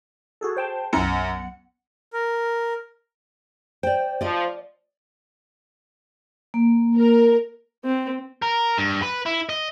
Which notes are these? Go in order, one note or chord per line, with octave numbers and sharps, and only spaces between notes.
F#4 G#4 A4
C5 G5 A5
B1 F#2 F#5 C#7
A#4
C5 D5 G5
F3 D5 D#5
A#3
A#4
C4
A#4
G2
B4
E4
D#5